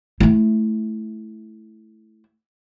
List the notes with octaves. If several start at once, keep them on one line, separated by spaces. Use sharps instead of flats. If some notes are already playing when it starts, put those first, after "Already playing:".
A3 E4